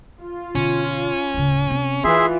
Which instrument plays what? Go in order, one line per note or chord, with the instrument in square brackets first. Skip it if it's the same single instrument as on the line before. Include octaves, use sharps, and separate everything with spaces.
[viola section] F4
[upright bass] B2 D3 [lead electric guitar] C#4
[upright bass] D1 C#3
C3 C4
[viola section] E3 F4 [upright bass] D#4 [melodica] G#4 E5 C6